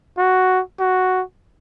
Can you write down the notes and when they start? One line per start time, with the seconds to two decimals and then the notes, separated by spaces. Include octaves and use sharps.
0.18 F#4
0.79 F#4